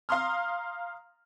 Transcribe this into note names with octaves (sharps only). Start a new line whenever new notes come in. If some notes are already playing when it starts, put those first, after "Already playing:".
F5 A#5 C6 D#6 F6